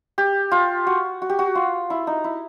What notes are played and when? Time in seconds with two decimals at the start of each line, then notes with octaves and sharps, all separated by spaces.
0.18 G4
0.51 F4
0.87 F#4
1.22 F#4
1.30 G4
1.39 F#4
1.55 F4
1.90 E4
2.07 D#4
2.24 E4